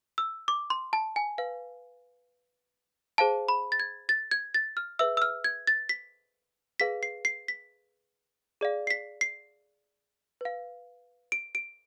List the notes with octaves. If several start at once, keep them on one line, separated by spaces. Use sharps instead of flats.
E6
D6
C6
A5
G#5
B4 F5
G#4 C5 F5 A5
B5
A6
G#6
A6
G#6
A6
F6
G#4 B4 E5 E6
E6
F6
G#6
A6
B6
G#4 B4 F5 B6
C7
C7
B6
G#4 D5 F5
C7
B6
C7
B4 F5
D7
D7